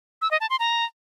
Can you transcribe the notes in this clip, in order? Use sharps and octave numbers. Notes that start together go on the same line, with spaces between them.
E6
D#5
A5
C6
A#5